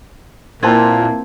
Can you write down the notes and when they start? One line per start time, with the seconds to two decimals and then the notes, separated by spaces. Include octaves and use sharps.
0.63 A#2 A#3 C4 E4 F4 B4 A5 G#6